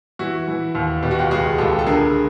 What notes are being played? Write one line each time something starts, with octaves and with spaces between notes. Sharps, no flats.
E3 E4 F#4
E3
D#2
B2 G4
F#4
F4 G4
C#2 F#4 G#4
C#2 G4 A4
A4
D3 G#4 A#4